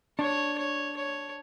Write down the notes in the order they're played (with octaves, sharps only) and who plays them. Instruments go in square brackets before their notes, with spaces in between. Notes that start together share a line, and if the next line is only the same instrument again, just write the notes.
[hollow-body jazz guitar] D4 [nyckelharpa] C#5
[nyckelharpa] C#5
C#5